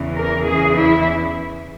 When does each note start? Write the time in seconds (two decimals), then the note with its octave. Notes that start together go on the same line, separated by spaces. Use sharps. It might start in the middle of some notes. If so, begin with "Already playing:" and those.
Already playing: E2 C#3 E3
0.16 A#4
0.45 E2 C#3 E3 G#4
0.76 E4